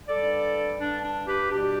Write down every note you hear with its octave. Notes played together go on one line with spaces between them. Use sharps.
G2 G3 A4 D5
G2 G3 D4
D4
G4 B4
B2 G3 D4 G4